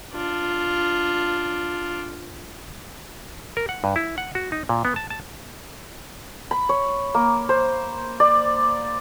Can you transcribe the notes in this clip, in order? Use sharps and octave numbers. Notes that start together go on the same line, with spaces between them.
D4 F4
A#4
F#5
G2
E4
F#5
F#4
D#4
A#2
B3
A5
A5
B5
C#5
A#3
C5
D5